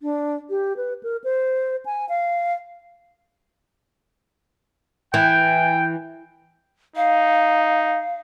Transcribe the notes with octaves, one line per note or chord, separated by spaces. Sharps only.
D4
G4
B4
A#4
C5
G#5
F5
E3 G5
D#4 F5